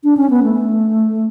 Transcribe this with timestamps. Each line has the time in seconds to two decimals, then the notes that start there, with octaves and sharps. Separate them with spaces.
0.04 D4
0.17 C#4
0.30 B3
0.43 A3